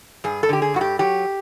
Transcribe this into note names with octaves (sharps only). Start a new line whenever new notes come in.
G2 G#4
A4
D3 G4
G#4
G2 F#4
G4
F#3 G4